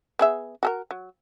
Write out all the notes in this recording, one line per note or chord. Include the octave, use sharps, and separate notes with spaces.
B3 G#4 E5
F#4 A4 A#4
F#3